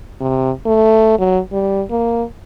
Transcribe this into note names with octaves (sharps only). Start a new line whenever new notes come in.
C3
A3
F#3
G3
A#3